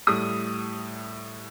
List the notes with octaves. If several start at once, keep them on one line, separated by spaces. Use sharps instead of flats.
A2 G3 D#6